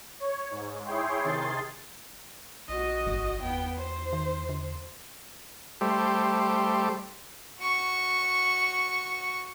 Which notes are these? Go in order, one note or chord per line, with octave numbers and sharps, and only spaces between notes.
C#5
G#2
E4 G#4 C#5 G5 C6
C3 D#3 G#4 C6 A6
A#1 F#4 D#5
G1
E2 B3 G5
C5
D#3
D3
G3 A3 G4 C5
F#4 C#6